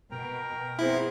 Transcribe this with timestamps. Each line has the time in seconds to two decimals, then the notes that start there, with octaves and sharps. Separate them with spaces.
0.11 B2 A#4 G5 A#5
0.79 B3 C4 E4 G#4